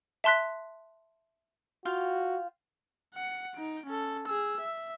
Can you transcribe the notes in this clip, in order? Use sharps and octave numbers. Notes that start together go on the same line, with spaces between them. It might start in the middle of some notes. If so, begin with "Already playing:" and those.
E5 A5 C6 F#6 B6
F4 F#4 F5 G5
F#5 C#7
D#4 D7
C#4 A4
G#4 E6
E5